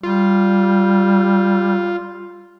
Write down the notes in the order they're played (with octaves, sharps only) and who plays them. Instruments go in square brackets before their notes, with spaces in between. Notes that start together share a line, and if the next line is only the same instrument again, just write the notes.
[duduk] G3 [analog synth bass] F4